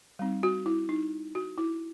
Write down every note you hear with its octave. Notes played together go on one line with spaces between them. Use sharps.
G3 C4 D#4
F#4
E4
D#4
F#4
E4